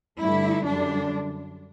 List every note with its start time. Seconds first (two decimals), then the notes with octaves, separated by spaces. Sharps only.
0.19 G2 D3 A3 E4
0.66 F#2 D3 G3 D4